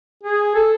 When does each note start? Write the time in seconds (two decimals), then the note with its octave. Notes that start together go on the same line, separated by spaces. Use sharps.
0.23 G#4
0.55 A4